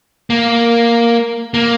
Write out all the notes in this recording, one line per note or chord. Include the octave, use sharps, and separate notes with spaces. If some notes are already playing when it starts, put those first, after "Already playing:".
A#3
A#3